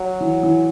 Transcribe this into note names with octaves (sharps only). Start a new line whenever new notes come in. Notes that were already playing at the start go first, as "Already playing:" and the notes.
Already playing: F#3
E3
E3